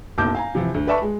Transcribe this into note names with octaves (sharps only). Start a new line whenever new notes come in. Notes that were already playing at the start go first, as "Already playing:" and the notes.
F#1 B1 A5 D6 G6
F5 G#5 A#5
C3 E3 F3
D2
B4 D5 E5 A5 C#6
G#3